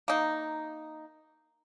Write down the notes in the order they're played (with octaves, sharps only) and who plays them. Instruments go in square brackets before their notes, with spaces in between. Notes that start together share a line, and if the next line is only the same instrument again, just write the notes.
[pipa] A#3 D#4